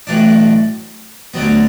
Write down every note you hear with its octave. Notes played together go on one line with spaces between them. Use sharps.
B1 A2 E3 D4
D2 D3 F#3 B3